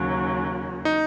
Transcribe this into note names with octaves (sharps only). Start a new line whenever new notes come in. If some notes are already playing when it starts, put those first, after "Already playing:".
Already playing: D#2 C#3 F#3
D#4